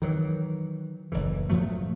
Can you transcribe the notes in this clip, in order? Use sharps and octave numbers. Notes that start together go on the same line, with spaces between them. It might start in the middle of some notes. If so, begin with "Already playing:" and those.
D#3 E3 F#3
F#1 A2 E3
A2 F3 F#3 A3